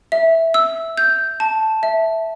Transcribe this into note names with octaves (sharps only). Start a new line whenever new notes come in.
E5
E6
G6
A5
E5